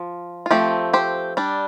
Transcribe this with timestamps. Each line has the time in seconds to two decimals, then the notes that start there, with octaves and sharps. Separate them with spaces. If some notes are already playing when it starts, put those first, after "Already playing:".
Already playing: F3
0.46 F4
0.51 F3 A3 C4 G4
0.93 G4 C5
1.37 G3 D4